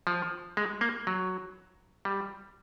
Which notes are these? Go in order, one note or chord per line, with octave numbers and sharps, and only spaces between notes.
F3
G#3
A#3
F#3
G3